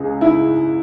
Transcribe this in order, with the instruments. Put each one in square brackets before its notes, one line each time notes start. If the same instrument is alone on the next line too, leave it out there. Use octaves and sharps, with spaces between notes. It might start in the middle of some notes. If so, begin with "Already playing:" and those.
Already playing: [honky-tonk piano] C#2 C#3 G#3 G#4
[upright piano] E4